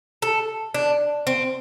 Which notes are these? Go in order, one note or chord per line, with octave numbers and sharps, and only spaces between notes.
A4
D4
C4